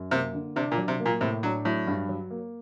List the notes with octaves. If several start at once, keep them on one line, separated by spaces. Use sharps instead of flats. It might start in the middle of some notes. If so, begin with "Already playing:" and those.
Already playing: F#2
C3 A#3
D3
C3 D4
A#2
F#3
C3
A#3
A#2
A2 C3
F#3 D4
A2 F#3
G2
F#3
A#3